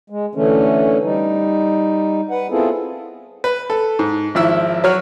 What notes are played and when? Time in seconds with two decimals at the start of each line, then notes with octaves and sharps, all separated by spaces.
0.10 G#3
0.35 D3 E3 A3 C#4
1.03 G3 D#4
2.31 B4 F#5
2.50 B3 C4 E4 F4 G#4 A4
3.44 B4
3.70 A4
3.99 G#2
4.35 G#1 F3 E4 E6
4.84 F#3 F#4 C#5 F6